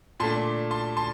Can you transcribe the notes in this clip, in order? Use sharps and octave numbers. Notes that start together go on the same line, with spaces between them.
A#2 A3 D4 A5 C6
A5 C6
A5 C6